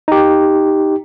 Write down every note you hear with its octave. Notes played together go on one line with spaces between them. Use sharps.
D#4 G4